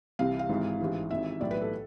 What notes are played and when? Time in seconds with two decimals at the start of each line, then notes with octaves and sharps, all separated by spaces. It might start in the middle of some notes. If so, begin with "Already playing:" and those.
0.19 C2 C3 E3 F5
0.39 F5
0.49 G#1 G#2 E3
0.80 A1 G#2 E3
1.10 G#1 G#2 E3 E5
1.41 B1 A2 E3 D5
1.51 B4
1.61 A4